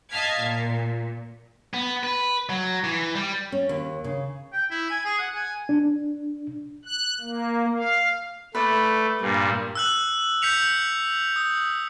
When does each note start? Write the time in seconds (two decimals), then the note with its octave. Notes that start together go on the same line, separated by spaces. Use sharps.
0.12 D#5 F5 A5 F6 G#6 B6
0.43 A#2
1.74 B3
2.04 B4
2.49 F#3
2.84 E3
3.15 G3
3.52 C#4
3.69 D#2
4.04 C#3
4.53 G5
4.71 E4
4.90 G#5
5.05 G#4
5.18 F#5
5.35 G#5
5.69 D4
6.85 F#6
7.21 A#3
7.74 F5
8.55 A3 B4 D5
9.21 G2 A#2
9.75 E6 F#6 F#7
10.42 G6 B6 C#7 F7
11.36 D#6